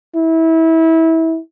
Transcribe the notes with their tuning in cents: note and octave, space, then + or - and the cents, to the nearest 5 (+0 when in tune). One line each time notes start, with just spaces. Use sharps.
E4 -25